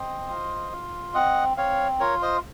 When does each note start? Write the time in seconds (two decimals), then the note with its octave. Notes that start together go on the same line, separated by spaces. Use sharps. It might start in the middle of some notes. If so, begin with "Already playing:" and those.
Already playing: C4 C5 D#5
0.29 F4
0.72 F4
1.14 C4 D#5 F#5
1.57 C4 C#5 F5
2.00 F4 A#4 C#5
2.22 C5 D#5